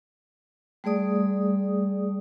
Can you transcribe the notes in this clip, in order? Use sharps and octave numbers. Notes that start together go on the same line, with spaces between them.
G3 A3 G#4 D5 D#6